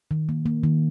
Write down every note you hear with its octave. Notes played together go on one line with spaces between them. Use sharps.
D#3
A#3
A#3
D#3